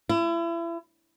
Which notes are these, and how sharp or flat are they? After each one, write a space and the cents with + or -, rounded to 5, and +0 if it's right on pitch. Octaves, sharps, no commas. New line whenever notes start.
E4 +35